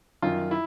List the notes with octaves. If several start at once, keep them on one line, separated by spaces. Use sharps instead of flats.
F#2 D#3 F4
E4